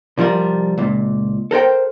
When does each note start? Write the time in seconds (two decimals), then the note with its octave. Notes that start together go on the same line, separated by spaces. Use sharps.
0.18 C2 F3 G3 F4 A#4
0.78 C#2 A#2
1.51 A4 A#4 C5 G5